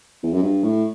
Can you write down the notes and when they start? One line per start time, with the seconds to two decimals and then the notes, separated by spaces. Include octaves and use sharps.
0.23 E2
0.34 F#2
0.43 G2
0.63 A2